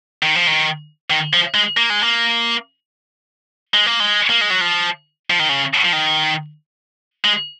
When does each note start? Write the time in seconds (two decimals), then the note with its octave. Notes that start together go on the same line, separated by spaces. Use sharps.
0.23 D#3
0.36 F3
0.47 D#3
1.10 D#3
1.33 F3
1.54 G#3
1.77 A#3
1.90 G#3
2.03 A#3
3.74 G#3
3.86 A#3
4.00 G#3
4.30 A#3
4.41 G#3
4.50 F#3
4.61 F3
5.30 F3
5.39 D#3
5.49 C#3
5.85 F3
5.93 D#3
7.25 G#3